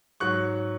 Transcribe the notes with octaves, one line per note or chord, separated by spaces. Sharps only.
G#2 F#3 C#6 F#6